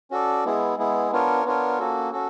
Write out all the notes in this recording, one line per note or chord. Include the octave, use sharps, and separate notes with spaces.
C#4 F#4 A4 D5
G#3 B3 E4 G#4
G#3 B3 E4 G#4
B3 D4 F4 A#4 C#5
B3 D4 F4 A#4 C#5
A#3 C#4 F#4 A4
C#4 F#4 A4